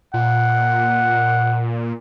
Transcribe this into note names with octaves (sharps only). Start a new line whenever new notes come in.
A#2 F#5